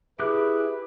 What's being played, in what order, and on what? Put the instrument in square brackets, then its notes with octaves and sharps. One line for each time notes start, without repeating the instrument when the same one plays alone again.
[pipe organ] E4 [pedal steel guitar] G4 D6 F#6 [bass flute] G#4 [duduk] B4